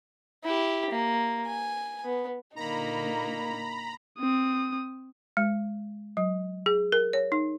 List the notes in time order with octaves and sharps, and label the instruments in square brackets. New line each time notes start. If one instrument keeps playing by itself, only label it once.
[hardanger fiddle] E4 G4
A#3
G#5
B3
[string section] A#2 D3 [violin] A#3 D#4 [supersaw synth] A#5 B5
[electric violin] C4 D#6
[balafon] G#3
F#3
G#4
A#4
C#5
D#4